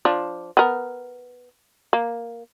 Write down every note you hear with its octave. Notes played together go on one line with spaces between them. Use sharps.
F3 D4
B3 A#4
A#3